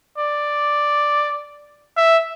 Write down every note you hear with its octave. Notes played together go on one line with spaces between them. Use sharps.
D5
E5